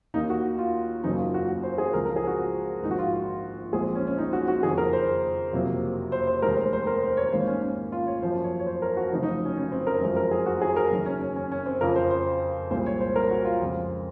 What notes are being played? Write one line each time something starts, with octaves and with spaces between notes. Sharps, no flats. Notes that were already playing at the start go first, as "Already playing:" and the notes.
D#2 D#3 A#3 D#4
F#4
F4
F#1 F#2 C#3 F#3 A#3 D#4
F4
F#4
F#4
C5
G#4
C#2 C#3 F3 C4 A#4
A#4
G#4
F#4
A#1 G#2 D#3 D#4
F#4
F4
F4
A#1 A#2 G#3 C4 G#4
C#4
C#4
D#4
F#4
F#4
F#1 F2 D#3 G#4
A#4
C5
F#1 F2 C3 F#3 A#3
C5
C5
F1 D#2 D#3 G#3 A#4
C5
C5
A#4
C5
C#5
G#1 G#2 D#3 A#3 C5
C#4
C#4
F4
C#5
F#2 F3 A#3 C5
C#5
C#5
C5
A#4
F#4
F1 F2 C#3 F#3 D#4
D#4
C#4
C#4
C4
A#4
F#2 F3 G#3 C4
A#4
G#4
F#4
G#4
A#4
F#1 F#2 D#3
C#4
C#4
C#4
C#4
C4
F2 C#3 F3 A#4
C5
C5
C2 A#2 G#3 C4 C5
C#5
C5
A#4
F#4
F4
F2 C#3 G#3 C4